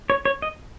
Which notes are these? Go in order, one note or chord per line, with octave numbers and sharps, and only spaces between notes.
C#5
C#5
D#5